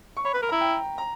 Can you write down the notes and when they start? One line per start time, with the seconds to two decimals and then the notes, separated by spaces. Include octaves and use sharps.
0.17 C#6
0.25 C#5 B5
0.34 B4
0.36 B5
0.42 A#4
0.49 E4 A#5
0.61 G5
0.98 A#5